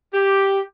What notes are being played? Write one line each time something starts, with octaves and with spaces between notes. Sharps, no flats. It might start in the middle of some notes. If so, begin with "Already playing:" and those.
G4